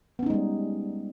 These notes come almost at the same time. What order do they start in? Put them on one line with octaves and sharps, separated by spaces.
B3 C#4 D#4 G#3 G3